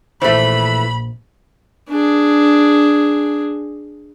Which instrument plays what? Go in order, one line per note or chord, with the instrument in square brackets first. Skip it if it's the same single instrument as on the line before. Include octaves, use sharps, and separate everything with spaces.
[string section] A#1 [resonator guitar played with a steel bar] E3 A3 [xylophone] C5 [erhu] B5
[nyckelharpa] D4 G#4